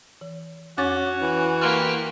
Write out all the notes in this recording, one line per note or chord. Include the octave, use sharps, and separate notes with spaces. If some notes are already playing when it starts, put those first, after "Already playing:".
E3
F2 C#4 F#4 D6 A6
E3
A#3 G4 B5 C6 F6